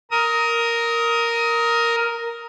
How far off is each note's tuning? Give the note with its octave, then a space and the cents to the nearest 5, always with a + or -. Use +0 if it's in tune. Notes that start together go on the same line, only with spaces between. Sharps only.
A#4 +0 D#6 +20